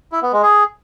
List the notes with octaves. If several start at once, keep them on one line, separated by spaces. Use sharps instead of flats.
E4
B3
G#3
G#4